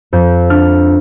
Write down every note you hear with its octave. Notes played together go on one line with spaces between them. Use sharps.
F2 G6
D4 F6